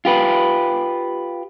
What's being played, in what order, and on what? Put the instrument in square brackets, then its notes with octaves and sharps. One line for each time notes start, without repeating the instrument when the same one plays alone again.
[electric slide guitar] F4 G4 B4